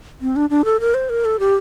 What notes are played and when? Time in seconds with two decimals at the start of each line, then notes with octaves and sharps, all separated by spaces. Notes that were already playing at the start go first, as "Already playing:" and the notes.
0.22 C4
0.36 D4
0.50 D4
0.65 A4
0.80 A#4
0.94 C5
1.10 A#4
1.25 A4
1.39 G4